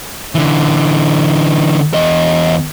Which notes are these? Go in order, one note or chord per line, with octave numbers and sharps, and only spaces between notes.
D3 E3
E2 D#5